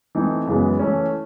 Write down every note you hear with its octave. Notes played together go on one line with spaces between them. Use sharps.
E3 A3 C4 D#4
F#2 C#3 E3 G#3 B3
E3 A3 C#4